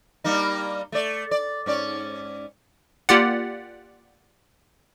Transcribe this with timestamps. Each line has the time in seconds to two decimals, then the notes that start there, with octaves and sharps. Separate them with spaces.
0.24 G3 A#3 D#4
0.92 A3 D5
1.31 D5
1.66 G#2 C#4 D5
3.09 A#3 F4 G4 D5 F#5